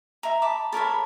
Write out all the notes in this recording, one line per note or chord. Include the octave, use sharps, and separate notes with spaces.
E5 A#5
A5 B5 D6
A4 A#4 C#5 B5